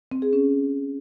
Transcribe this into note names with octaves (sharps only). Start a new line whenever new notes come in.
C4
G#4
C#4